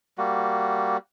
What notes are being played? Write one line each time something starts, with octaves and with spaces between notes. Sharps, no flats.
G3 A#3 F#4